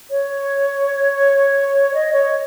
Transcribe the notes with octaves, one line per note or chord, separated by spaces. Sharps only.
C#5
D#5
C#5